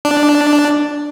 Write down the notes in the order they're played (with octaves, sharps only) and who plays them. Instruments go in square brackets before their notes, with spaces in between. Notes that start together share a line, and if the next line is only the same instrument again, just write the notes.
[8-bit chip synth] D4